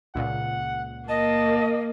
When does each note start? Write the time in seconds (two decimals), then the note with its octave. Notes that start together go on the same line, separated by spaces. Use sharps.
0.15 C#2 A#2 F#5
1.09 A#3 D#5 A5